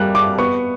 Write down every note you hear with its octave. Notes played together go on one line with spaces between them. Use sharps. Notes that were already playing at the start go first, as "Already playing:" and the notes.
Already playing: G3 A#3 F#6
D6
B3 C#6